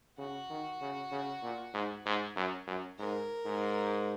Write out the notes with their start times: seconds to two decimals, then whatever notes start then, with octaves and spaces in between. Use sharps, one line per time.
0.18 C#3 F#4
0.50 D#3
0.81 C#3
1.11 C#3
1.43 A#2
1.73 G#2
2.06 G#2
2.36 F#2
2.67 F#2
2.98 G#2 A#4
3.45 G#2